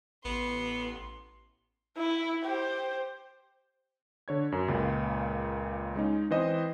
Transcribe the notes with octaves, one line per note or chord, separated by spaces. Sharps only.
A1 B3 C6
E4
G4 C5
D3 C#5 G#6
F#2
C#2 A#2 C#3
G#3 C#4 D#4
E3 C4 C5 D#5